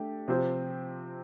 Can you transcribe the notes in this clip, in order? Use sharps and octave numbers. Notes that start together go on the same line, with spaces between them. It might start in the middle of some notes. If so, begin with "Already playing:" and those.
Already playing: A3 D4 G4
C3 F3 C4 G4 C5